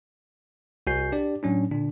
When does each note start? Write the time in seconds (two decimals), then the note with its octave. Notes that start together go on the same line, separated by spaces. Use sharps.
0.87 C2 F#4 G#5 G6 C7
1.12 D4 G4 D5
1.43 A2 F#3 C#4 D4
1.71 A#2 D3 D4